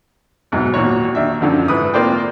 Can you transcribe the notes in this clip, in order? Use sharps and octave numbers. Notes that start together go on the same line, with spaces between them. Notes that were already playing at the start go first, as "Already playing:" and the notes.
E2 G#2 B2 F#3
D#2 A#2 F#4 C#5
D#2 D4 E5
F#2 D3 F3
G#2 E4 B4 D#6
A#3 C4 F4 C5 D5 G5